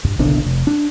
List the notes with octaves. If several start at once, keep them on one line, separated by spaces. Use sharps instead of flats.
G2
F#1 B1 D3 D4
F1
D4